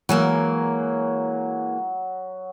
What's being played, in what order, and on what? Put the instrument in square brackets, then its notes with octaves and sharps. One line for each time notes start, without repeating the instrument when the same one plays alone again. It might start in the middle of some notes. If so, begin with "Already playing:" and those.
[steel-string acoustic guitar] E3 G#3 A#3 [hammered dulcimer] F#3